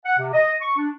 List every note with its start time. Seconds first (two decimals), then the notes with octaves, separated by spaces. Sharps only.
0.05 F#5
0.19 C3
0.34 D#5
0.61 C#6
0.77 D4